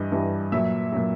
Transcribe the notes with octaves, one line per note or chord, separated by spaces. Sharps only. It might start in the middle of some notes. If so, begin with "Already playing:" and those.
Already playing: G2 E3 G3 D#5
G2 E3 G3
A#2 F#3 E5
A#2 F#3